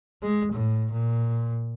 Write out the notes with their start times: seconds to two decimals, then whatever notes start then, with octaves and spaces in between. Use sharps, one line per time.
0.23 G#3
0.52 A2
0.92 A#2